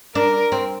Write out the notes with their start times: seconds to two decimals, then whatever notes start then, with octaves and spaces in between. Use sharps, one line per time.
0.15 D4 A#4
0.52 C4